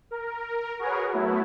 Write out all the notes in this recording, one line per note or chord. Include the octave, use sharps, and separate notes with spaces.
A#4
F#4 G#4 A#4 B4 C#5
F#3 A3 B3 E4